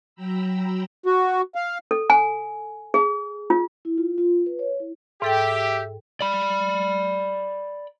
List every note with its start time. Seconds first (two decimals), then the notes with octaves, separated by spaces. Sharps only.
0.15 F#3 G5 A#5 B5 E6
1.06 F#4
1.55 F5
1.91 A4
2.10 G#5
2.94 G#4
3.50 F4
3.85 E4
3.98 F4
4.18 F4
4.46 B4
4.59 C#5
4.80 E4
5.22 G#2 G4 A4 E5 G5
6.21 D5 B5